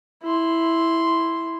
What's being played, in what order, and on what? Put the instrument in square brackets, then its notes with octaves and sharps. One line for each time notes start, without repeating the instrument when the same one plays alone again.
[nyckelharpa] E4 C6